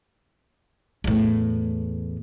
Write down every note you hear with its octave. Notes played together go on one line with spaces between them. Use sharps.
E2 A2